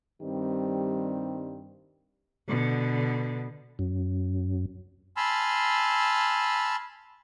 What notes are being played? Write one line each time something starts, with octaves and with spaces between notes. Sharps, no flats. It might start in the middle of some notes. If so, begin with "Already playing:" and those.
G2 D#3 G3 C4 G4
B2 D3
F#2
G#5 A5 B5 C6 E6 F6